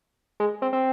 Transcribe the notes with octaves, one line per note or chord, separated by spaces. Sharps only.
G#3
C4
C4